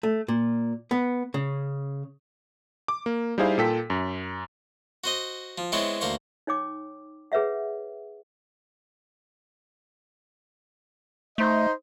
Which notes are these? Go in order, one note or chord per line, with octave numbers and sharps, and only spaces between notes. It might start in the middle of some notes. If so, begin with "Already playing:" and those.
A3
A#2
B3
C#3
D6
A#3
G3 D#4 E4 G#4 C5 F5
A#2 F4 A4 G5 B6
F#2
F#4 C5 D#5
F3
G#3 B3 C4 E4 C#5
D2 A#3 C5 C#6
D#4 C#5 G5 D6
G#4 B4 C#5 E5 F#5
A3 D#4 C5 D#5